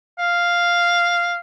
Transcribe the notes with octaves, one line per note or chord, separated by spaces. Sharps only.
F5